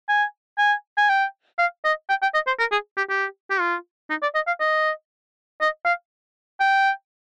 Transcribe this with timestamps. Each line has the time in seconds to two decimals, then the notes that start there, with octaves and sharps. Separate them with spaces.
0.09 G#5
0.58 G#5
0.98 G#5
1.09 G5
1.58 F5
1.85 D#5
2.09 G5
2.22 G5
2.34 D#5
2.47 C5
2.59 A#4
2.72 G#4
2.97 G4
3.10 G4
3.50 G4
3.60 F4
4.10 D#4
4.22 D5
4.35 D#5
4.47 F5
4.60 D#5
5.61 D#5
5.85 F5
6.60 G5